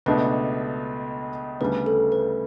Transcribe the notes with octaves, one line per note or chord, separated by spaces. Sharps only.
C#2 B2 A3 D4 A4 B4
D2 C#3 G3 B3 D4 B4
A4
B4